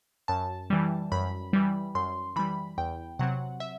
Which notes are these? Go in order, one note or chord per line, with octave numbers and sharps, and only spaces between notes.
F#2 A5
E3 G3
F#2 B5
E3 G3
F#2 C6
E3 G3 B5
E2 G5
C3 F#3 C4 F#5
E5